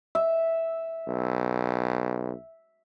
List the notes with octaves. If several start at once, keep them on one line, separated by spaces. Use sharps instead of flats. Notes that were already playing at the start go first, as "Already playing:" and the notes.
E5
B1